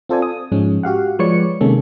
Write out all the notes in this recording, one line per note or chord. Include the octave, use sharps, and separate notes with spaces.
C4 F4 A4 C5 D5 G#5
D#6
G#2 F3 G#3 C#4
F#4 G4 F5 F#5
F3 G#3 B4 C#5 D5 C#7
C3 D#3 G#3 A#3 C#4 A4